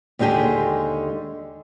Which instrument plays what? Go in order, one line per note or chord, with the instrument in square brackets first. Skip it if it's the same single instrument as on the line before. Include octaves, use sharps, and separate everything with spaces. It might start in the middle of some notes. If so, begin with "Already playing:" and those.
[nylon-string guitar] D#2 D3 G#3 G4 G#4 A5